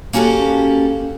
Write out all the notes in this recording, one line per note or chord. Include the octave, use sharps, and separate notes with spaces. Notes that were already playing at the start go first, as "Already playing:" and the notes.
A#3 C#4 F#4 G4 A4